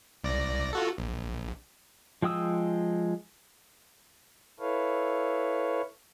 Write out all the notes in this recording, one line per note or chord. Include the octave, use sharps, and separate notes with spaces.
C2 D5 A#6
F4 F#4 A4
A#1
F3 G#3 G5 D#6 E6
E4 A4 B4 C#5 F5